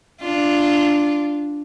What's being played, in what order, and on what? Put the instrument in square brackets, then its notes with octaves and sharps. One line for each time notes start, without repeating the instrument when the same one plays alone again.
[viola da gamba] D4 F4